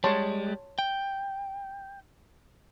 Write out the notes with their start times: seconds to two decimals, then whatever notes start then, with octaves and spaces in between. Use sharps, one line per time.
0.04 G3 G#3 C#5 A5 C6
0.79 G5